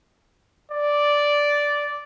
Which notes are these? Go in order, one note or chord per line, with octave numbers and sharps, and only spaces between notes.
D5